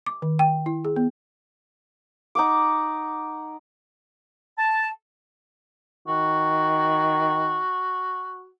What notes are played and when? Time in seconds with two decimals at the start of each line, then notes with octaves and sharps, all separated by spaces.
0.06 D6
0.22 D#3
0.39 G5
0.66 E4
0.85 G#4
0.96 B3
2.35 D#4 F#5 D6
4.59 A5
6.08 D#3 F#4